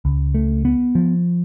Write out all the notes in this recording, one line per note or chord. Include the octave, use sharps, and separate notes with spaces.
C#2
A3
B3
F3